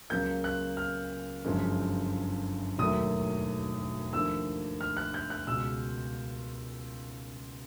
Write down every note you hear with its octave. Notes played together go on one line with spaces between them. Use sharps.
C#2 C#3 F#3 A#3 G6
F#6
F6
G1 F#2 C#3 F3 G#3
E1 D#2 D#3 F#3 A3 D#6
D#2 D3 F3 A3 E6
F6
F#6
G6
F#6
C#2 B2 G#3 E6